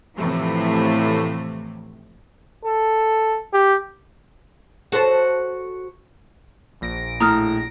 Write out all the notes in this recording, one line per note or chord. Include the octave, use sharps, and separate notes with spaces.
A2 C3 E3 F3 A3
A4
G4
F#4 A4 C5
A#1 A#6 D7
A2 A#5 D#6 F6